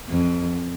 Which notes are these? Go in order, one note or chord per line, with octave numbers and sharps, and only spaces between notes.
F2